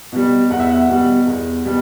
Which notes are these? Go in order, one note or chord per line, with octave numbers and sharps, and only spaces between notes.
B2 G3
E2 F#5
E5
F#5
B2 G3
E2
B2 G3